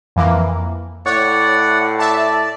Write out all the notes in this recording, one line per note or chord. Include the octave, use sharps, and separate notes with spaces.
F2 E3 A#3
A2 C#5 D5 F#5
D5 E5 A5